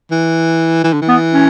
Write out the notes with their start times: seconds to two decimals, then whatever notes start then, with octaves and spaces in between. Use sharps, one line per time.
0.11 E3
0.84 E3
0.93 D3
1.02 E3
1.08 B3
1.33 C#4